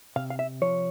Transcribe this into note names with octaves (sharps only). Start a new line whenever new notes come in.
C3 F5
F5
E5
F3 C#5